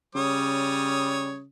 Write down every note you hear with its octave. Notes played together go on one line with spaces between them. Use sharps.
C#3 G3 C#5 D#6